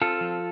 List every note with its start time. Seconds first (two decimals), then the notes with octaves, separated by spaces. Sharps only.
0.02 C4 F4 A4
0.21 F3